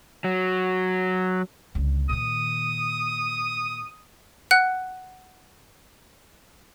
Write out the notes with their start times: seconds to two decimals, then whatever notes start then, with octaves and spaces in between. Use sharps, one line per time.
0.24 F#3
1.75 C#2 D3
2.09 A#2 D#3 D#6
4.51 F#5 F#6